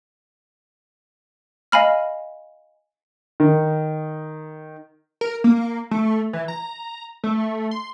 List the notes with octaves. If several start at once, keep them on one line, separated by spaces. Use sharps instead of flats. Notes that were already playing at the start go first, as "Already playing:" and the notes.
D#5 F5 G#5 B5 F6
D#3
A#4
A#3
A3
E3
A#5
A3
C6